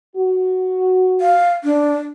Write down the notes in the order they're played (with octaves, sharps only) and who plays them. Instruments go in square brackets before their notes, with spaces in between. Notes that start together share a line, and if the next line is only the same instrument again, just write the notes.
[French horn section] F#4
[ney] F5
D4